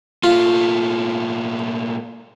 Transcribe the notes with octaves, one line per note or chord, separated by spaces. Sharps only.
A#2 A3 F4